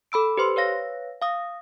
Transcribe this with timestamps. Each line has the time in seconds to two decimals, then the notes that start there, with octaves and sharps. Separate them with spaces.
0.12 A4 B5 E6 D7
0.37 G4 B4 C5 C6
0.56 B4 C#5 F5 A#6
1.22 F5 D#6